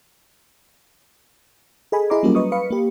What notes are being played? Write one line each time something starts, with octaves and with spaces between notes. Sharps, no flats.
G#4 A4 D#5 G#5 B5
E4 G#4 D#5 A#5 C6 D6
F#3 G3 A#3 C#4 F4 A#4
B4 D#5 C#6 D#6
B4 F5 B5 C#7
A#3 G4